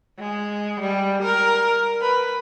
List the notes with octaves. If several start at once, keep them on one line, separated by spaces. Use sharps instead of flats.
G#3
G3
A#4
B4